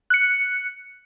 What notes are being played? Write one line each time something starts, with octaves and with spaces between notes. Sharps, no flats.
F#6 C#7